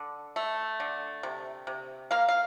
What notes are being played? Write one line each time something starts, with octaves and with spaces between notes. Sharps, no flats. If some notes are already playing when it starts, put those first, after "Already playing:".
Already playing: D3
A3
D3
C3
C3
A#3 F5
F5